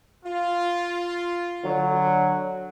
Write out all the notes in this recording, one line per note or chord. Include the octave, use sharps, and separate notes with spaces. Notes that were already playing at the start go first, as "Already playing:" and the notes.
F4
D3 F#3